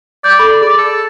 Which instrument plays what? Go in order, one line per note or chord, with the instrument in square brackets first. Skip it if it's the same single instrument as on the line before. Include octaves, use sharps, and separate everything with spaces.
[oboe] D5 [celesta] G6
[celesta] A4 B5
[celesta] G#4 [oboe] D5
[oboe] A4